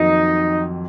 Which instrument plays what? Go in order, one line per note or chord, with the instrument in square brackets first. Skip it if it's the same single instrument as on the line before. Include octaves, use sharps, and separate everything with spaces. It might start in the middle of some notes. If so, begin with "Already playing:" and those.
Already playing: [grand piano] F2 D#3 F#3 A#3 [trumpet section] D#4